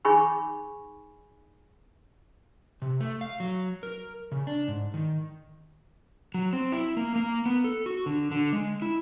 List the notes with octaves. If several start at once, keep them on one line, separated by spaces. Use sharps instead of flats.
D#4 G#4 G#5 B5 C#6
C3
A3
F5
F#3
A#4
C#3
D4
G#2
D#3
F#3
C4
E4
A#3
A#3
B3
A4
F#4
D3
D3
G#3
E4